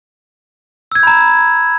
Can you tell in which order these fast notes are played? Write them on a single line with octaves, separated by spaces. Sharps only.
E6 G#6 G6 B5 A#5